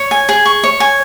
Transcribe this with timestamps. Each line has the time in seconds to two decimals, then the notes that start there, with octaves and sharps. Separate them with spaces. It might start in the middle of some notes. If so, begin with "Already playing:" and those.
Already playing: C#5
0.11 G#5
0.29 G#4
0.46 C#6
0.64 C#5
0.80 G#5